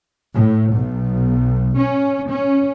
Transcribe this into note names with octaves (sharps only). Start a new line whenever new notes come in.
A2
B1
C#4
C#4